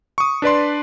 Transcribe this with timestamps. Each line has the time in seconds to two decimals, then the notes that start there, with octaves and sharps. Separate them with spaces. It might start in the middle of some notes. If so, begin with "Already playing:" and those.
0.18 C#6 D#6
0.42 D4 B4 D5 C6